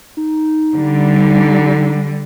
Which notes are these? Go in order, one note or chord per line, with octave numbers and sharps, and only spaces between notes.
D#4
D3 G3